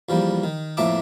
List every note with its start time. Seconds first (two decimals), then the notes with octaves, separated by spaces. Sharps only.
0.09 E2 F3 G3 A#3
0.44 D#3
0.77 F2 A2 A#3 E5 A5 D6